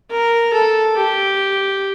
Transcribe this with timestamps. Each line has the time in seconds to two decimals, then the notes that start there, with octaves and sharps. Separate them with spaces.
0.11 A#4
0.53 A4
0.97 G4